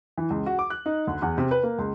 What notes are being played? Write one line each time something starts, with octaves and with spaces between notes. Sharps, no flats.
E3
C#2
F#4
D6
F#6
D#4
D2
E2
C3
B4
A#3
C#2